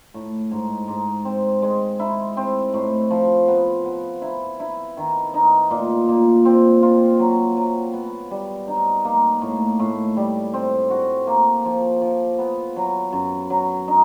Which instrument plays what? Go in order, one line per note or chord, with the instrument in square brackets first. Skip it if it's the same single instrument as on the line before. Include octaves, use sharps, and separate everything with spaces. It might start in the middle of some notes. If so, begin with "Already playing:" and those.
[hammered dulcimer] A2
G#2
G#2
C4
G#3
E4
C4
A2
F3
B3
B3
E4
E4
D#3
D#4
A#2
A#2
C4
F4
F#3
F#3
B3
G3
D#4
A#3
A2
A2
G3
C4
F#4
A#3
F3
F3
B3
F#3
F#2
F#3
D#4